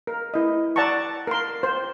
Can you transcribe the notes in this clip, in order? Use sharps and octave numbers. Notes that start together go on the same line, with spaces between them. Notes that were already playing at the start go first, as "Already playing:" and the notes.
A#4
E4 D#5
D5 F#5 A5 A#5 C#6
A#4 C6
C5